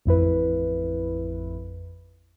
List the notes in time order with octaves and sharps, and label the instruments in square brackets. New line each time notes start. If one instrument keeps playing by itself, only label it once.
[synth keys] A1 F2 E4 B4